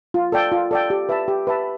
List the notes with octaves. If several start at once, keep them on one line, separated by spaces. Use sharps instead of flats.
F4
A4 D5 G5
F4
A4 D5 G5
G4
B4 E5 A5
G4
B4 E5 A5